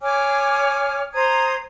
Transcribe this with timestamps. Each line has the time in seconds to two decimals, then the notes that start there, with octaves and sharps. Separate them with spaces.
0.01 C#5 G#5 D6 F6
1.14 C5 A#5 D#6 G#6